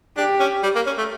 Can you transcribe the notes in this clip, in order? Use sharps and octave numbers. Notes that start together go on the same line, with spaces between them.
D4 G4
C#4
G3
A#3
C#4
A3